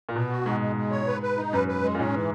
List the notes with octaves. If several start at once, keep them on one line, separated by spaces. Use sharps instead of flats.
A#2
B2 B3
F#4
G#2 G#3
G#3
G#3
C#5
B4
B4
D#4
F#2 B4
B4
G#3
A#2
G#2 C#4
E3